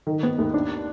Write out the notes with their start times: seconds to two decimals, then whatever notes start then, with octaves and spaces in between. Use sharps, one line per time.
0.07 D#3
0.23 B3
0.38 D#2
0.54 D4